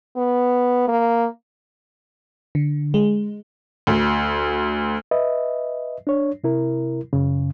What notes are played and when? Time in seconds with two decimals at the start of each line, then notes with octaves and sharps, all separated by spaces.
0.16 B3
0.88 A#3
2.55 D3
2.94 G#3
3.87 D2
5.11 B4 D#5 E5
6.07 D4 C#5
6.44 C3 E4 A#4
7.13 F#2 C#3